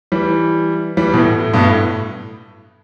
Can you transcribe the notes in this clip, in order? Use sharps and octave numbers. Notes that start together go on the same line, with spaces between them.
E3 G3
E3 G3
B2
A2
A2
G2 B2
A2